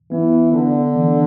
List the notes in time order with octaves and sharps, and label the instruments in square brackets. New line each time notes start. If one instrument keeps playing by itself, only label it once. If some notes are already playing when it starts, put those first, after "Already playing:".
[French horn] E3 [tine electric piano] B3
[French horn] D3 [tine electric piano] D4
[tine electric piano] E3